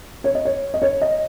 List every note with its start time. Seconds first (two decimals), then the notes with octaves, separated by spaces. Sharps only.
0.24 C#5
0.35 D#5
0.45 C#5
0.74 D#5
0.82 C#5
1.02 D#5